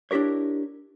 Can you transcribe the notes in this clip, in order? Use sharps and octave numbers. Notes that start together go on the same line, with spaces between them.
D4 E4 G4 A#4 C#5